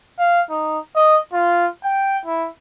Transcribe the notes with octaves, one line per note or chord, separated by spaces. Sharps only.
F5
D#4
D#5
F4
G5
E4